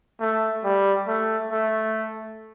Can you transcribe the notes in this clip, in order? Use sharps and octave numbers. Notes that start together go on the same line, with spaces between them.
A3
G3
A3
A3